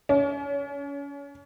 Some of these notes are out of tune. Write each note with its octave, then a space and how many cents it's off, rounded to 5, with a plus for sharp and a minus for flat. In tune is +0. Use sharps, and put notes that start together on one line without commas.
C#4 +35